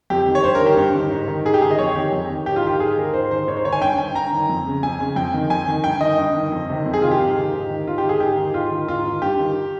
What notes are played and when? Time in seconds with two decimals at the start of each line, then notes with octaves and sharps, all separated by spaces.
0.10 F2 G4
0.27 D#3
0.35 C#5
0.44 G2 C5
0.55 A#4
0.60 D#3
0.66 G4
0.77 G2
0.95 D#3
1.11 G#2
1.28 D#3
1.45 G#2 G#4
1.54 G4
1.62 D#3 G#4
1.71 D#5
1.79 F2 C#5
1.95 D#3 G4
2.12 F2
2.30 D#3
2.46 G#2 G4
2.56 F4
2.64 D#3 G4
2.80 G#2 G#4
2.97 D#3 A#4
3.13 G#2 C5
3.31 D#3 C5
3.48 G#2 C#5
3.57 C5
3.65 D#3 C#5
3.72 G#5
3.81 G2 G5
3.98 D#3 G#5
4.15 G2 A#5
4.33 D#3
4.49 F2
4.66 C#3
4.83 F2 G#5
5.00 C#3
5.16 F2 G5
5.34 D#3
5.50 F2 G#5
5.67 D#3
5.84 G2 G5
6.01 D#3 D#5
6.18 G2
6.35 D#3
6.52 F2
6.69 C3 D#3
6.86 F2
6.93 G#4
7.02 C3 D#3 F4
7.11 G4
7.19 G#2
7.37 D#3
7.53 G#2
7.70 D#3
7.87 G#2 F4
7.98 G4
8.03 D#3
8.09 G#4
8.20 G#2 G4
8.37 D#3
8.54 G#2 F4
8.71 D#3
8.88 G#2 F4
9.05 D#3
9.22 G2 G4
9.39 D#3